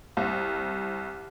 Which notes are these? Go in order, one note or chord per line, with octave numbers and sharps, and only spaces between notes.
C2